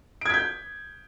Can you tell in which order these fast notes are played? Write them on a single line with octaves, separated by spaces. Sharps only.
D7 G#6 B6 G6